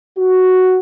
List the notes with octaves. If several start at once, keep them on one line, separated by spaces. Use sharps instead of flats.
F#4